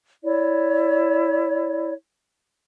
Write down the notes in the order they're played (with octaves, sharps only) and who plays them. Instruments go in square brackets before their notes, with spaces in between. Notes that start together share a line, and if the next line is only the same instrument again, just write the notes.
[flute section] E4 C#5 D5